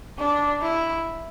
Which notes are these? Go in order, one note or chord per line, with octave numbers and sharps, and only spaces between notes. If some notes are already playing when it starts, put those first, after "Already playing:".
D4
E4